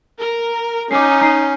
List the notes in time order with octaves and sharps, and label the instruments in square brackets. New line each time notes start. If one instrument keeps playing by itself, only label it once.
[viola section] A#4
[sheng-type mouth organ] C#4 [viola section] D#4 [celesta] D6 C7
[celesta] A#5 C7